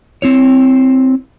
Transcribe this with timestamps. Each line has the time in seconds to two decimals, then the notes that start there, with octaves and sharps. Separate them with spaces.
0.22 C4 E4 C#5